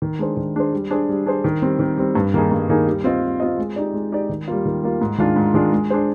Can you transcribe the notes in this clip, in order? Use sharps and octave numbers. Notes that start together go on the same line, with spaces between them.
D#3
G#3 D4 G#4 C5
D#3
G#3 D4 G#4 C5
G3
D4 G#4 C5
G3
D4 G#4 C5
D#3
G3 C4
D#3
G3 C4
G2
D#3 A#3 D#4 G#4
G2
D#3 A#3 D#4 G#4
G3
C4 F4 C5 D#5
G3
C4 F4 C5 D#5
G#3
D#4 G4 D5
G#3
D#4 G4 D5
D#3
G3 A#3 F4
D#3
G3 A#3 F4
G#2
D#3 G#3 D4 F4
G#2
D#3 G#3 D4 F4
G#3
D4 G#4 C5